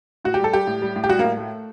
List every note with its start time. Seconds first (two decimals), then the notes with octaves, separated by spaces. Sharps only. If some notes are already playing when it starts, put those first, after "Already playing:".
0.25 A2 F#4
0.34 G4
0.39 G3 A4
0.53 G3 G4
0.67 A2
0.82 G3
0.96 A2
1.04 G4
1.09 G3 F#4
1.19 A2 A#3
1.37 A3